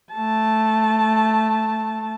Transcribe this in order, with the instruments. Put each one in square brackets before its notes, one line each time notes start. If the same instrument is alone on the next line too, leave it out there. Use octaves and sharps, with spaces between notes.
[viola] A3 A5